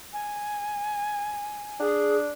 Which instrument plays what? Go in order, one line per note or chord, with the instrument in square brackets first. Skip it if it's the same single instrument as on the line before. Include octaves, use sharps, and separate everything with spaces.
[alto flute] G#5
[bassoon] D4 [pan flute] G#4